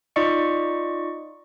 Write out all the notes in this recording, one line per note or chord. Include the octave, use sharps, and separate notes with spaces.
D#4 F4 D5 D#5 C#6 C#7